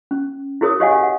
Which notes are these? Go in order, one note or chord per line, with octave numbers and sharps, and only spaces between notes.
C#4
E4 F#4 G#4 A#4 C#5 D#6
G4 C#5 D#5 F5 F#5 G#5
F#5